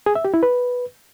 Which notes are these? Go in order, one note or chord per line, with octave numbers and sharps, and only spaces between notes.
G#4
E5
G4
E4
B4